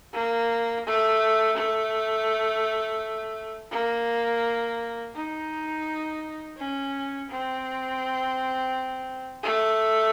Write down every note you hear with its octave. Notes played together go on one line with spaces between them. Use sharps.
A#3
A3
A3
A#3
D#4
C#4
C4
A3